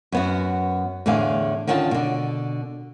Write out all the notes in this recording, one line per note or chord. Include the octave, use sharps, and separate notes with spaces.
F#2 B3 F#4
E2 A2 D3 G#4 F5
D3 D#3 C#4 F4 F5 A5
B2 D3